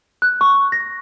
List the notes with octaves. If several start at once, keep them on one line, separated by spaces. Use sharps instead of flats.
F#6
C#6
A#6